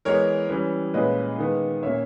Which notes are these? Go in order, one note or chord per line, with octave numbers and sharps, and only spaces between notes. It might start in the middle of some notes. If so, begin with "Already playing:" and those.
E3 G#3 B3 A#4 C#5
E3 G3 C#4
A#2 G#3 C#4 B4 D#5
D#3 G#3 B3
A#2 A#3 C#4 C#5 E5